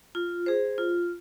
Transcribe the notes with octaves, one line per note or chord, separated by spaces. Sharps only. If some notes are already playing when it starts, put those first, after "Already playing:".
F4
G#4 C5
F4